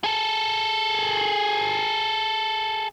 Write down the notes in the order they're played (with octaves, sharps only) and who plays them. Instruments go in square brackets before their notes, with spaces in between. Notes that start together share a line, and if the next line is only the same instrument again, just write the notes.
[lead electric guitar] G#4 A4